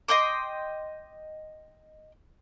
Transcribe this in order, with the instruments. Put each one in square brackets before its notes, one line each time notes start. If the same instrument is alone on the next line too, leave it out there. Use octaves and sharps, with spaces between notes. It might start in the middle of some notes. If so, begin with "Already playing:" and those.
[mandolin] D#5 G5 C6 D6